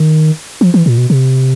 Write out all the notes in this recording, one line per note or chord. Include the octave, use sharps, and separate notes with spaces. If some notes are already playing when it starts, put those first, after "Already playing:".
Already playing: D#3
F3
E3
A#2
B2
C3